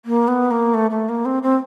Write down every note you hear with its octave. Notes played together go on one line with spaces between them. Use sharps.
A#3
B3
A#3
A3
A3
A#3
C4
C4